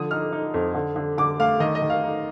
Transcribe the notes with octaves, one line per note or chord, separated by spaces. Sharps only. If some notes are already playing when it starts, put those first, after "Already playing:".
Already playing: D3 F3 D#6
D#4 F6
D#4
F2
D3
D3
D3 D6
A3 F5
D#3 D#5
D#5
D#3
F5
D#4